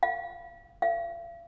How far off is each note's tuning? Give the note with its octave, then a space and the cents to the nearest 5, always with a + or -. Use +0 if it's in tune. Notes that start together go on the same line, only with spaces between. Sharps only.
F5 -20
F5 -45